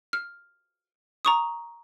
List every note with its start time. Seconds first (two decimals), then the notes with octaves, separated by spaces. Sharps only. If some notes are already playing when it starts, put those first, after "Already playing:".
0.13 F6
1.25 A#5 C#6 D#6